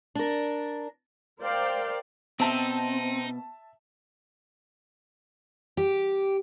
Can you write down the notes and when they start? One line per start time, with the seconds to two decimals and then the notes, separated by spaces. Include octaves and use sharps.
0.15 D4 A#4
1.40 A#4 C5 D5 F5 G5
2.40 B2 C4 D#4 E5 A5
5.77 G4